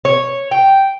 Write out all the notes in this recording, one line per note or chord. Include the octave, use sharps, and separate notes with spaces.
C#5
G5